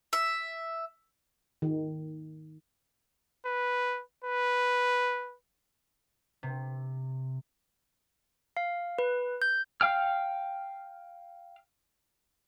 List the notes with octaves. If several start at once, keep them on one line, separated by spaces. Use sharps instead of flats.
E5
D#3
B4
B4
C3
F5
B4
G6
F5 G5 F6